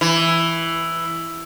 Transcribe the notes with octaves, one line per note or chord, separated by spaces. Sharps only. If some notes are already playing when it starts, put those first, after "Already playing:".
E3